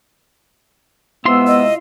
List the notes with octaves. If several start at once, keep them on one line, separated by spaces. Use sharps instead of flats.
C3 G#3 B3 E4 F4 C6 E6
D#5